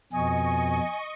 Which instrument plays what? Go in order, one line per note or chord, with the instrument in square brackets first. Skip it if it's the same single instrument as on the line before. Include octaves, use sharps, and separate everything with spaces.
[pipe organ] F2 B2 [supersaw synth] D#5 C#6 [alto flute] G#5